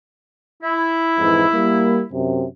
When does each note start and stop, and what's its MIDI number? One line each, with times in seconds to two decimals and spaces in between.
0.63 2.06 64
1.18 1.44 41
1.18 1.44 44
1.18 1.44 52
1.52 2.02 55
1.52 2.02 58
2.12 2.45 42
2.12 2.45 48